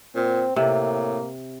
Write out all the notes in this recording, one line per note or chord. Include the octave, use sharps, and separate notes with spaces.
A#2 C4
A2 C3 A#3